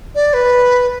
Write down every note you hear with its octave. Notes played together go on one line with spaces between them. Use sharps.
D5
B4